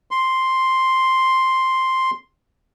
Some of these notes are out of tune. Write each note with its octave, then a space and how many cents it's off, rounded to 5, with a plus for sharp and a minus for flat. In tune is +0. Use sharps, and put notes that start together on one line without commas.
C6 +0